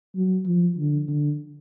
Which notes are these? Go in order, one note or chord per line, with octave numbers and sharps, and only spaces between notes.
F#3
F3
D3
D3